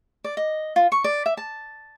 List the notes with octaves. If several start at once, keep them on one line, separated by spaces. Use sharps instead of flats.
D5
D#5
F4
C#6
D5
E5
A5